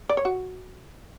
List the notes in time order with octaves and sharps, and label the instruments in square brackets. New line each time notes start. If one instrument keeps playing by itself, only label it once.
[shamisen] D5
C#5
F#4